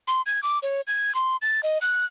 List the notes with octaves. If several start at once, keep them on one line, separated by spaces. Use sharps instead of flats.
C6
G#6
D6
C#5
G#6
C6
A6
D#5
F#6